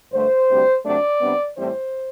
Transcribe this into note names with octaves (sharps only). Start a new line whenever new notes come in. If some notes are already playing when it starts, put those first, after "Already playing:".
G2 D3 A3 C5
D2 C3 G3
C3 F#3 A3 D4 D5
C3 G3 B3 D4
A2 E3 G3 C4 C5